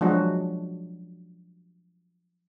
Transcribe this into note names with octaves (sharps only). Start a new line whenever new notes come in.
F3 F#3 G#3 D4 F#4